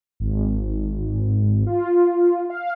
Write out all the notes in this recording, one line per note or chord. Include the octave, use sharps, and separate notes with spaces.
G#1
F4
F5